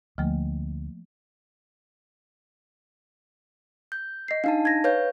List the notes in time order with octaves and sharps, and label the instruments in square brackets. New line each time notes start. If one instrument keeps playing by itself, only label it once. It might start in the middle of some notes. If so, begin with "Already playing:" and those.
[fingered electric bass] D2 [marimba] F3 A3 A#3
[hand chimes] G6
[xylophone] D#5 C7
[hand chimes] D4 D#4 A5 [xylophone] F5
[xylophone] G#6 A#6
[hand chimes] B4 C#5 G6 [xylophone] F5